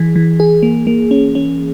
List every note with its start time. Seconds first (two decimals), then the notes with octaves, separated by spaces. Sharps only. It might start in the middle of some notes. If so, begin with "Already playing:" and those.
Already playing: E3 G#4
0.16 E3
0.40 G#4
0.63 A#3
0.87 A#3
1.11 C#4
1.35 C#4